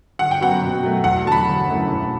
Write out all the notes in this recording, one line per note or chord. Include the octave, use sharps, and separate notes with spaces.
G1 F#5
G5
F#2 F#3 B3 F#4 F#5
B2
F#3 A3
E2 F#5
D3 F#3 A5
B5
G1
F#2 E3 A3
E1